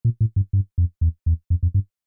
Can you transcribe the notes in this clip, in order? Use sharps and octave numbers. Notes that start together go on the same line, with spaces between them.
A#2
A2
G2
G2
F2
E2
E2
F2
F2
G2